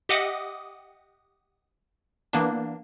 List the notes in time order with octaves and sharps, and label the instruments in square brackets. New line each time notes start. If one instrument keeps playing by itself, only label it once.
[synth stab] G4 D#5 E5 F#5 D6 D#6
E3 A#3 B3 D4